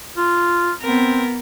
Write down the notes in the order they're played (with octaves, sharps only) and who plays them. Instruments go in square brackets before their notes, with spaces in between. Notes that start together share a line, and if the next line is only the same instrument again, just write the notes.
[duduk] F4
[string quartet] B3 A#4 [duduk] C4